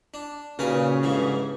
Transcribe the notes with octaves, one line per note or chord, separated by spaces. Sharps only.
D4
D#2 A#2 C#3 F#4 A#4 B4 G#5
G1 G#2 E3 F3